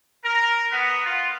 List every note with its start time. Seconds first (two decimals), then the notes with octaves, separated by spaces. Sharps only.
0.25 A#4
0.72 B3
1.06 F4